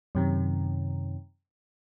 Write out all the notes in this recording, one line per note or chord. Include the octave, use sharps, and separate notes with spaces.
F#2 C3 D#3